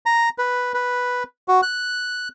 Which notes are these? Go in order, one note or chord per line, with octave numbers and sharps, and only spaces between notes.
A#5
B4
B4
F#4
F#6